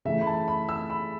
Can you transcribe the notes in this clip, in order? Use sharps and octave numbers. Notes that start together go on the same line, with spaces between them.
C#3 E3 A3 E5
B5
A5
B5
E6
B5